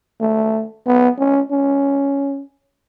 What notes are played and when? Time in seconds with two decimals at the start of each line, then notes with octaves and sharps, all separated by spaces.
0.21 A3
0.86 B3
1.18 C#4
1.51 C#4